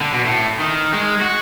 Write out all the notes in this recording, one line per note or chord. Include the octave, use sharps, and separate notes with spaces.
D3
B2
A2
D#3
G#3
F#4